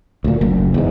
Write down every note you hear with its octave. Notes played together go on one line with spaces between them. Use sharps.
D2 A#2
F#1
E2 G#2